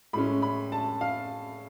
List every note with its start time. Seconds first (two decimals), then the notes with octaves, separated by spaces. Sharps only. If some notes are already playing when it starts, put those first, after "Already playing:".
0.13 A2 G#3 C#4 B5
0.42 B5
0.72 A5
1.01 F5